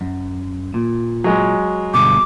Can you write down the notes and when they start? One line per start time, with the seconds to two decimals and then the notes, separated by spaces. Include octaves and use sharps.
0.01 F#2
0.74 A#2
1.24 F#3 G#3
1.94 G2 B2 D3 D6